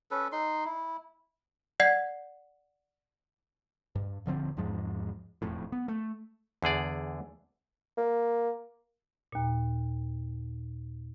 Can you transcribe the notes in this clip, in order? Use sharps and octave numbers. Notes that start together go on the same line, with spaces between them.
C#4 A4 B4
D#4 C6
E4
D5 F#5 G#6 C7
G2
D#1 D3 F3 C4
E2 G#2 F3 G#3
E1 F2 A2
B3
A3
E2 D3 G#4 D5
A#3
D#2 A#2